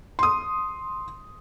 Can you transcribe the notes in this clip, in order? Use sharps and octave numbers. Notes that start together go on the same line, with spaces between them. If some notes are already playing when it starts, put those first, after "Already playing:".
C6 D#6